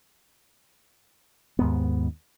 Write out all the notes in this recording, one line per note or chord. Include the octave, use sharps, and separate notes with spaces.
D#2 G#2 B3